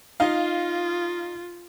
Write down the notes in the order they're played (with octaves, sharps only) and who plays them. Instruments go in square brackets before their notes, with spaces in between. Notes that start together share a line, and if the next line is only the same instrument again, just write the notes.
[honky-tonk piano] D#4 F5 [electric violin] F4